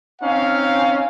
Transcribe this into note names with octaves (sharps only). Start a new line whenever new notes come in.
C4 C#4 D#4 F5